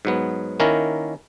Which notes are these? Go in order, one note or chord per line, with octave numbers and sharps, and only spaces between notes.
G#2 F#3 B3
D#3 A#3 C#4 E4 A#4